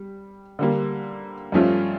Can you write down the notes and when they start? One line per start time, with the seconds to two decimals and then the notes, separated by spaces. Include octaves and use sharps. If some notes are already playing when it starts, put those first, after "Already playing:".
Already playing: G3
0.59 D3 G3 A#3
1.52 G2 F3 A3 C#4 F4